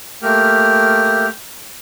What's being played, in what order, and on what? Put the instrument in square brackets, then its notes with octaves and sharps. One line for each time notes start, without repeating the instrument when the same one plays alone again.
[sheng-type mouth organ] A3 A#3 G4 F6